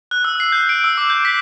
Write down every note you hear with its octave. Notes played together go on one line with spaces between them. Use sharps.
F#6
E6
C7
G6
D7
E6
D6
G6
B6